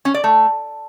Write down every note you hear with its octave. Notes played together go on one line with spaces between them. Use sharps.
C#4
D5
A3